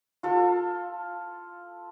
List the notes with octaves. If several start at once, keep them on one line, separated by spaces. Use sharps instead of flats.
F4 A4